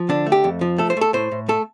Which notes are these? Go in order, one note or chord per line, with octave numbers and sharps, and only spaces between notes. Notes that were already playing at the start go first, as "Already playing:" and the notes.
Already playing: F3
D3 D4
A3
G4
F2
F3
A3 A4
C5
A3 A4
A2 C5
A2
A3 A4